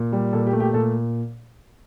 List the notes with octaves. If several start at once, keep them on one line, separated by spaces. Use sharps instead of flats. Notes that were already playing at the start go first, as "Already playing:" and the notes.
Already playing: A#2
G3
A#2 A4
G4
A3
G4
A#2 A4